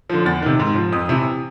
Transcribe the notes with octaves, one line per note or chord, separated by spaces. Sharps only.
D3 F3
E2 A6
C3 D#3
G#2
F3
F2 D#6
C3 E3